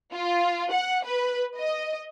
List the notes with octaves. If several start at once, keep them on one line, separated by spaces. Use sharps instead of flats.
F4
F#5
B4
D#5